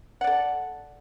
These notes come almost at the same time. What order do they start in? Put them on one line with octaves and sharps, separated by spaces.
F#5 D5 A4